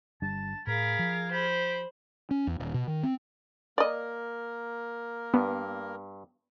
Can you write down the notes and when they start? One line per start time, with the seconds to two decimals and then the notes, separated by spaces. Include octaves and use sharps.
0.22 G1 G3 D4 A5
0.67 A2 G#4 A#4 F5 B5 F6 G#6
0.99 F3
1.31 G4 C5 B5
2.31 C#4
2.47 E2
2.60 D#1
2.74 B2
2.88 D#3
3.03 C4
3.78 A#3 A#4 D5 D#5
5.34 G2 B3